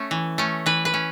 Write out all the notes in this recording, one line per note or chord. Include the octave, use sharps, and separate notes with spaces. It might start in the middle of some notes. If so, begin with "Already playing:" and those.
Already playing: A3 C#4
E3
A3 C#4
E3 B4
B4
C#4